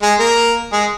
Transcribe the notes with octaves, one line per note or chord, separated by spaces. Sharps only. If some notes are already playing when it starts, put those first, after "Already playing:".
G#3 G#4
A#3 A#4
G#3 G#4